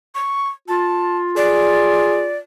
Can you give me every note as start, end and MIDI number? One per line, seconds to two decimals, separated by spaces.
0.15 0.49 85
0.68 2.40 65
0.68 1.17 81
1.37 2.26 68
1.37 2.37 74